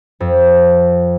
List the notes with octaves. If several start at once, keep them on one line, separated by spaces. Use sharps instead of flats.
F2